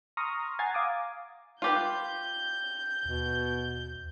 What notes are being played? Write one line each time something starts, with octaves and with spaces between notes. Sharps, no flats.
A#5 C6 C#6 D#6 F6 A#6
F#5 G#5 A#5 G#6 A6 C7
F5 D6 D#6
F4 G4 B4 G6
D#2 B2